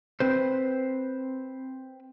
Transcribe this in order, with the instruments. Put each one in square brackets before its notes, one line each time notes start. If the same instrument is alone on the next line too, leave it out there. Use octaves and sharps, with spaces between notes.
[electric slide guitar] C4 B4 C5